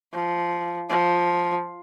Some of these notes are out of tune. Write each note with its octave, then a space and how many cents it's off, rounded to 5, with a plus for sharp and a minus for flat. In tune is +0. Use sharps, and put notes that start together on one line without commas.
F3 -10
F3 +5